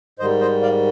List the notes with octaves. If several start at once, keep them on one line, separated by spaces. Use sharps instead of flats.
G#2 D#3 G3 C5 D#5
C5 D#5
D5 F5